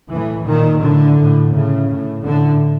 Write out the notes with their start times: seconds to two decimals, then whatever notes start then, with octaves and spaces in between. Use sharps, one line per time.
0.10 A2 E3
0.45 A#2 D#3
0.81 A2 D3
1.16 A2
1.52 A2 C#3
1.87 A2
2.24 A2 D3